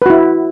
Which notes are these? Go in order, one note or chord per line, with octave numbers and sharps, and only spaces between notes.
E4 F#4 B4